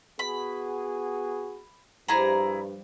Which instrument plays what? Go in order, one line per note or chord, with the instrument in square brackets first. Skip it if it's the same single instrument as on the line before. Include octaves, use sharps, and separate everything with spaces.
[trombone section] B3 F#4 G#4 [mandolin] B5
[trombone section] G2 [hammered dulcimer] F3 G3 [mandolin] E4 G#4 A#5